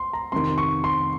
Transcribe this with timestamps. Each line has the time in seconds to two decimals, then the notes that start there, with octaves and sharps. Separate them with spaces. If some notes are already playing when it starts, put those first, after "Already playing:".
Already playing: C6
0.13 A#5
0.32 F2 C3 D#3 C6
0.58 C#6
0.84 C6